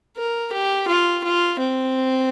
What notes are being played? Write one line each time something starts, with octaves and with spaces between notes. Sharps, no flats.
A#4
G4
F4
F4
C4